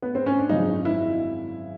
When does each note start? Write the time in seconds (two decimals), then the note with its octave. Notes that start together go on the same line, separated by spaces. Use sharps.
0.02 B3
0.15 C4
0.26 C#4
0.39 D4
0.49 G#1 F#2 C#3 F3 D#4
0.85 E4